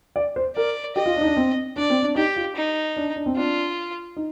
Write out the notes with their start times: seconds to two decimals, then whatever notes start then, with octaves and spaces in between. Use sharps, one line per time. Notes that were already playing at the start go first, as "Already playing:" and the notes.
0.16 D5
0.36 C5
0.56 A#4 D5
0.96 G4 D#5
1.06 F4
1.16 D4
1.21 D#4
1.26 D4
1.37 C4
1.76 D4 D5
1.90 C4
2.02 D4
2.16 D#4 G4
2.36 F4
2.56 D#4
2.96 D4
3.16 D4
3.26 C4
3.36 D4 F4
4.16 D#4